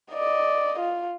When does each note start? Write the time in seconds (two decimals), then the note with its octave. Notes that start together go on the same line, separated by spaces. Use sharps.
0.12 D5 D#5
0.80 F4